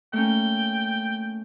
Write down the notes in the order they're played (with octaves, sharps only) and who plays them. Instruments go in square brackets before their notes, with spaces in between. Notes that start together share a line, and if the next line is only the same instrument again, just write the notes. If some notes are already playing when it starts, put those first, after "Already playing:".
[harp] A3 A#3 C#4 [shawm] G5